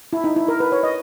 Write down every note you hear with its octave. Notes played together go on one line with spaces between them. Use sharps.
E4
D#4
E4
A#4
B4
C#5
D#5